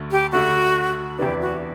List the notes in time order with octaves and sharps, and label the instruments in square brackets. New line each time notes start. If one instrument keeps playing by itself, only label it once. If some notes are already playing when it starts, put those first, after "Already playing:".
Already playing: [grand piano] D2 D3 A3
[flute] G4
[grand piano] D2 D3 A3 [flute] F#4
[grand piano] E2 C3 E3 B3 D4 [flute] G4
[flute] F#4